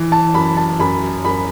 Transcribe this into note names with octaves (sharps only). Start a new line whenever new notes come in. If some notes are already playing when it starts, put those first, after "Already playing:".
Already playing: E3
A5
F#2 B5
A5
F#2 B5
F#2 B5